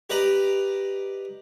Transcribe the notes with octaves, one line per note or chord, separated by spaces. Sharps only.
G4 B4 D5 D#5 A#5